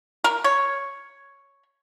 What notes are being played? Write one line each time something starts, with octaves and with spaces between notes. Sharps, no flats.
A#4
C#5